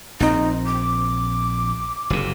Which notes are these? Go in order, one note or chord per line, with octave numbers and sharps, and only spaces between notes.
A#1 C4 D#4
D6
F#1 C3